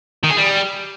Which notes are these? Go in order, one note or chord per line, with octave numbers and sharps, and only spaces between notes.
D#3
G#4
G3